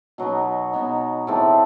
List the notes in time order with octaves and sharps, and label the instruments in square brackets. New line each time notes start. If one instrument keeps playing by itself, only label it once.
[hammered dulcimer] B2 F#3 B3 D#4
B2 F#3 B3 D#4
A2 E3 A3 C4